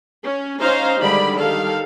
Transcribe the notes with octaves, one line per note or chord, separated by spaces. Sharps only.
C#4
C#4 D#4 C5 F5 A#5
D3 D#3 G3 G#3 D5 B5
D#3 G3 A4 F5